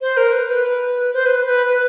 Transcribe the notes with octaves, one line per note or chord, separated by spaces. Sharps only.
C5
A#4
B4
B4
C5
B4
B4
B4